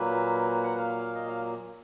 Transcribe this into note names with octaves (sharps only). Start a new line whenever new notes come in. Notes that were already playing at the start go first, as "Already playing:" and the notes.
Already playing: A#2 F#3 A#3 B4
F#5
F5
D#5
F5